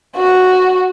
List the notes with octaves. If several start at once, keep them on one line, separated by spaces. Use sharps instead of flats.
F#4